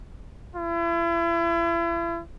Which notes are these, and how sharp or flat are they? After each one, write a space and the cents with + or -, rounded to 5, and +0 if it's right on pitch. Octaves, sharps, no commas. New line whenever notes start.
E4 +40